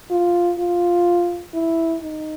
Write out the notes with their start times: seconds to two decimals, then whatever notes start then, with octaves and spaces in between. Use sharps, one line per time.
0.11 F4
0.59 F4
1.54 E4
2.02 D#4